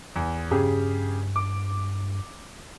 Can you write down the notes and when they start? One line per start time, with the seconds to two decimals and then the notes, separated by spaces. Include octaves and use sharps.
0.16 E2
0.51 G2 C#3 G4 G#4
1.36 D6